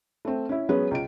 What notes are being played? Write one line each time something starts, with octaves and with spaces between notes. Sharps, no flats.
A3 C4
C#4 E4
F#3 G#3 B3 C#4 G#4
C#2 D7